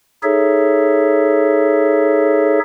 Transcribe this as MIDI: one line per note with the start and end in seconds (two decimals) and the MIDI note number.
0.23 2.59 63
0.23 2.59 68
0.23 2.59 69
0.23 2.59 73
0.23 2.59 76